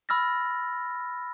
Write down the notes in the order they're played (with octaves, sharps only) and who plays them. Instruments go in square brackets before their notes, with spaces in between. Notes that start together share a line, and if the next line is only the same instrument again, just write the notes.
[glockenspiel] B5 E6 F6 A6 A#6